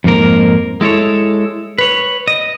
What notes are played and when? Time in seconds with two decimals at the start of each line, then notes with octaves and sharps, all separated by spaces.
0.04 F2 G#2 A#3 A#4
0.81 G#3 E4 A4 C#5
1.78 B4 C#5
2.28 D#5